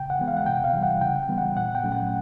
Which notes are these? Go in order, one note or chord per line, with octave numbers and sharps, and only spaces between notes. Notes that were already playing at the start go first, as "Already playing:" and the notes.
Already playing: C#3 G5
F#5
E3 G#3 B3
F5
F#5
C3 G5
F5
E3 G3
F#5
C#3 G5
E3 G3 B3
F#5
A#2 F#5
G5
F#3 A3 C#4
F#5